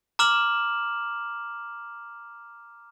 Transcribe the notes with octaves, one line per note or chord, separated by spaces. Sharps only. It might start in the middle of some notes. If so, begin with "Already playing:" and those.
A#5 D6 F6 E7 F#7